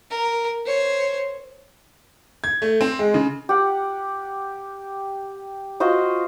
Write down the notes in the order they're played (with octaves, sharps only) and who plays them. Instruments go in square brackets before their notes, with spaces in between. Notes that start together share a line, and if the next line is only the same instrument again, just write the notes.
[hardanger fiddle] A#4
C5 C#5
[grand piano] G#6
A3
C4
G#3
C#3
[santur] G4 F#5
F4 F#4 C5 D#5